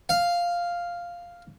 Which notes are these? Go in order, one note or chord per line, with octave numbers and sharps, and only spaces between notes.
F5